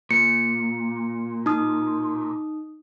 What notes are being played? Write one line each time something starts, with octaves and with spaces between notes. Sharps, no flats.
A#2 C#7
D#4 D#6